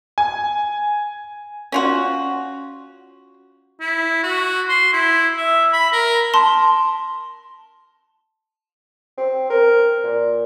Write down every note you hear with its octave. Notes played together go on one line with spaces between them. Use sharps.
G#5
C#4 F4 F#4
E4
F#4
C6
E4
E5
B5
A#4
A5 C6
C4
A#4
A#2